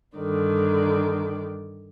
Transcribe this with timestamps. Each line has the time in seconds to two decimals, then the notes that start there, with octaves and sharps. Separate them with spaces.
0.14 G2 D3 D#3 D5